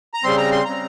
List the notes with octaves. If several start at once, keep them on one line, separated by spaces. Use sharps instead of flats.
A#5
C#3 G3 C4 C6
A#5
C6
C#3 G3 C4 A#5